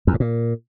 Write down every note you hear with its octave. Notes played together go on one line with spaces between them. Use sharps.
E2
G#2
A#2